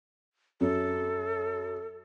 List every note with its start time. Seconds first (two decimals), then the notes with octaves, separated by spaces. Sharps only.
0.61 F#2 A4